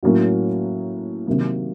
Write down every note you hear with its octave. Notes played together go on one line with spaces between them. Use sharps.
A2 F#3 A#3 C#4 F#4
C3 D#3 F#3 A#3